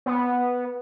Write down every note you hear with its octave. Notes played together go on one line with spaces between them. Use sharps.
B3